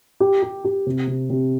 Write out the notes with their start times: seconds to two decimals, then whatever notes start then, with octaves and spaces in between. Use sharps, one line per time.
0.20 G4
0.42 G4
0.65 G4
0.87 C3
1.07 C3
1.30 C3